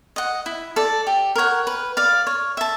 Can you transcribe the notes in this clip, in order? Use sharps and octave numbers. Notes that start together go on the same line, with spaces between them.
D#5 F#5
E4
A4 D5
G4
A#4 C#5 F#5
B4
D5 F5
C#5
E5 A5